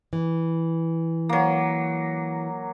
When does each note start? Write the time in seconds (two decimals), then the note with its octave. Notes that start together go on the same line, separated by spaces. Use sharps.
0.13 E3
1.29 F#3 A#3